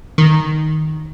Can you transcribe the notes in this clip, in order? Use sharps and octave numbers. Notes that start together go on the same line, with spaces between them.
D#3